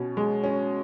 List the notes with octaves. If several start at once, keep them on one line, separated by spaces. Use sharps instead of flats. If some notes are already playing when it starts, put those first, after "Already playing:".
Already playing: B2 C#4
G#3
C#4